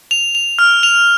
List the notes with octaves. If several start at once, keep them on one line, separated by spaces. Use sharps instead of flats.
F7
F7
F6
F7